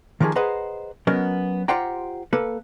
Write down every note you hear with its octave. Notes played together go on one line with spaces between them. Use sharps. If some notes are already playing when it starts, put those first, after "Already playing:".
D#3 F3 A#3 G4 G#4
G#4 B4 C5 D#5 F#5 A#5
F#3 B3 C#4 A#4 D#5
F4 G4 C5 F#5 G5 A#5
A#3 A4 B4